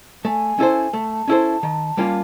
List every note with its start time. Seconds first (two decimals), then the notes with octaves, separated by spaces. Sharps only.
0.25 A3 G#5
0.59 C#4 E4 A4 C5
0.93 A3 A5
1.28 C#4 E4 A4 C5
1.63 D#3
1.97 G3 A#3 C#4 F4